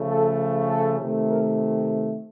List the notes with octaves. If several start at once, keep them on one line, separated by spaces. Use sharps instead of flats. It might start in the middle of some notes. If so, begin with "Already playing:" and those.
Already playing: C#3 F3 A3
A4
A4
C3 D#3 A3
A#4